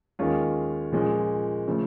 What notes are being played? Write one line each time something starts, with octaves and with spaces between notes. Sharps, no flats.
D#2 D#3 G#3 C#4 F4
A#2 F3 G#3 C#4
C#3 F3 A3